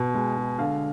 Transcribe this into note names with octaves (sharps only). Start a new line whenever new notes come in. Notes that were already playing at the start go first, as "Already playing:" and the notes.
Already playing: B2
G#3
G#3
D3 F5